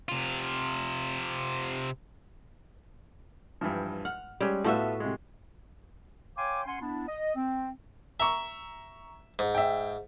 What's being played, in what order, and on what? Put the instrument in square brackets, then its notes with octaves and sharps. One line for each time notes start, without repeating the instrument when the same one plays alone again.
[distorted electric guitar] C3 F4
[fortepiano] G2 E3 F3
[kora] F#5 [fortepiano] F6
[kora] G3 [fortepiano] G#3 C#4 G#4
[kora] A2 F#4 E5 [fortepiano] B3 F4 A4
[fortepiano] C3 G#3
[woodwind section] C#5 F5 G5 G#5 C6 D6
C#4 F#5 G#5 C6
B3 D4 E4
D#5
C4
[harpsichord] E5 [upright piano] A#5 C#6
[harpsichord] G#2
[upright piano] E5 G5